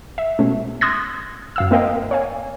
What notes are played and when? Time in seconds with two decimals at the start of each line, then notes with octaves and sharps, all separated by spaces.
0.18 E5
0.39 B2 G#3 A3 C#4
0.81 C6 D#6 E6 F#6 G#6 A#6
1.56 F#2 F5 E6
1.71 A#3 C4 A#4 D#5 F5 G5
2.11 C#5 F5 G#5